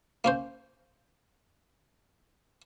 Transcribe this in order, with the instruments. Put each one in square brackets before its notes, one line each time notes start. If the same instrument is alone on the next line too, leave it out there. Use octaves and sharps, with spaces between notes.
[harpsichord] A#3 C#4 C5